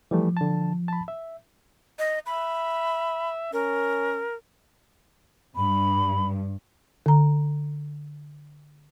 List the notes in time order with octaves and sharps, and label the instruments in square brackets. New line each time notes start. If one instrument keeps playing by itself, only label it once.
[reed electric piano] E3 G3 A3 [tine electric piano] F3
[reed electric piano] D3 A5
A5 B5
E5
[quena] D#5
[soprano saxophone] E5 [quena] B5
[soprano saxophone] C#4 [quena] A#4
[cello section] G2 [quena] B5
[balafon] D3 A#5